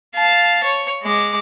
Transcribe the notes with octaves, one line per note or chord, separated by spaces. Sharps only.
F5 A5
C#5
G#3 D6